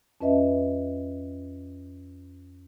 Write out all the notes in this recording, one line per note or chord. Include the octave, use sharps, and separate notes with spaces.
F2 C#4 B4 D#5 E5